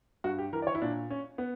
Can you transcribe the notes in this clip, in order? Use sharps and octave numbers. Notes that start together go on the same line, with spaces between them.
G2 F#4
G4
E3 A#4
D5
C#5
E4
A#2 D4
C#4
B3